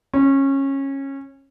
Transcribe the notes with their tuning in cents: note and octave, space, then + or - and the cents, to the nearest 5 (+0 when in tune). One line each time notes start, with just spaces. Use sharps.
C#4 -20